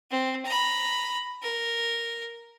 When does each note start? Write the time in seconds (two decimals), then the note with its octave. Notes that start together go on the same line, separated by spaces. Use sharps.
0.11 C4
0.46 A#5 B5
1.43 A#4